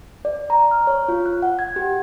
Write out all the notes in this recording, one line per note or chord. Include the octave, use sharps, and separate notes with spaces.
D5
A#5
F6
C#5
F4
F#6
F#5
G#6
G4